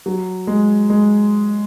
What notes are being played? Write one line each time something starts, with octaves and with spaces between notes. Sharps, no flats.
F#3
G#3
G#3